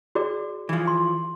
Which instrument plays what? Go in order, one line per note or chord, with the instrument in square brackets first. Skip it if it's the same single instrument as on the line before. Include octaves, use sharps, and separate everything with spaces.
[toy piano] F#4 G#4 D5
[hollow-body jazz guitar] E3 F3
[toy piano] C6